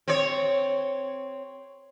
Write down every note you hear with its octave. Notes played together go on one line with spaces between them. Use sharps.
C4 C#5